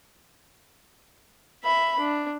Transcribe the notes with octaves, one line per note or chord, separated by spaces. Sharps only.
E5 B5
D4